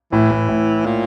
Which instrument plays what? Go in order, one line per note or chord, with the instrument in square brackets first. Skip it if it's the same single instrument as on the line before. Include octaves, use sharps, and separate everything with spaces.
[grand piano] A2 [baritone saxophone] E3
[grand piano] A2
A2
[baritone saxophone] A#2